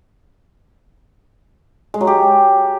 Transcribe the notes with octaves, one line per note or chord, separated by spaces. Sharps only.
G#3
F#3
G4